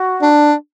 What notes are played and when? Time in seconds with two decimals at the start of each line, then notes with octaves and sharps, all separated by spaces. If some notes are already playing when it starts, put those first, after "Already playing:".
Already playing: F#4
0.22 D4